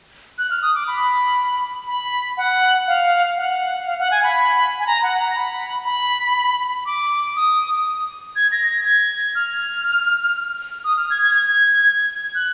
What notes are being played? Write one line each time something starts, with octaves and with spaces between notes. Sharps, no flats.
F#6
F6
D#6
D6
B5
B5
F#5
F5
F#5
F5
F#5
G#5
B5
G#5
A#5
F#5
A#5
B5
B5
D6
D#6
G#6
A#6
A#6
G#6
F6
D#6
F6
G#6
G#6
G#6
F#6